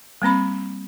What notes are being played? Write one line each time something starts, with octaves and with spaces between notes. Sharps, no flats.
G3 A#3 C4 B5